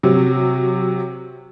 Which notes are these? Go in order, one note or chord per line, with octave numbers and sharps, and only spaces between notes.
C3 F#3